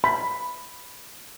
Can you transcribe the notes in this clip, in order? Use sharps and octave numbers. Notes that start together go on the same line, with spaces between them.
B5